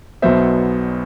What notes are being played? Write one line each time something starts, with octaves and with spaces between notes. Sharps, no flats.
B1 B2 F#3 B3 C5 E5